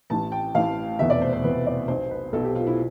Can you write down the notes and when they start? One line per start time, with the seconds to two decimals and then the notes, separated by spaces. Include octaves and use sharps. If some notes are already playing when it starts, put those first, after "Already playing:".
0.10 A1 A2 E3 A5
0.32 G5
0.54 A1 A2 E3 F5
0.99 F1 E2 B2 E5
1.10 D5
1.21 C5
1.33 C5
1.44 F1 E2 B2 B4
1.66 D5
1.88 B1 B2 C5
2.11 B4
2.33 B1 B2 A4
2.44 G4
2.55 F4
2.67 E4